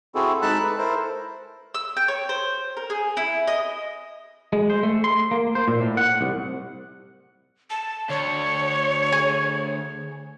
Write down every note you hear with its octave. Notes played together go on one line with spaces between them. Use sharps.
C4 E4 F#4 G#4 A4
G#3 D#4 A4 A5 B5 F#6
B4
E4 A4 A#4 C5
E6
G5
C#5
C5
A#4
G#4
E4
D#5
G#3
C5
A3
C6
A#3
C5
A#2
A2
F#5
C2
A5
D2 C#5
G#4